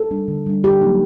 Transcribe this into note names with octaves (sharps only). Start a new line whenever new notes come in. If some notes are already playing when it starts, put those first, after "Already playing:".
Already playing: A4
G3 D4
D3
G3 D4
D3 G4
F#3 A#3 D#4